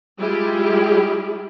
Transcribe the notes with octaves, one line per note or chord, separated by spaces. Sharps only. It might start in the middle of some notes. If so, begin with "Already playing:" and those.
G3 G#3 E4 F4 G4 G#4